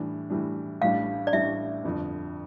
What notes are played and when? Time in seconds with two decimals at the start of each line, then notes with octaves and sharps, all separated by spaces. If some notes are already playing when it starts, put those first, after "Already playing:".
Already playing: A2 E3 G3 D4
0.30 A2 E3 G3 D4
0.81 A1 A2 G3 D4 F5
1.27 D5
1.33 A1 A2 G3 D4 E5
1.84 G1 F2 D3 F3